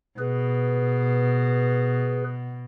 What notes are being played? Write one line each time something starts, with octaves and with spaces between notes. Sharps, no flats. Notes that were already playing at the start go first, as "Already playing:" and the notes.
B2 G#4 B4